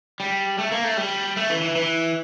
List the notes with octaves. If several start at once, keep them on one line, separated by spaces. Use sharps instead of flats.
G3
A3
A#3
A3
G3
A3
E3
E3
E3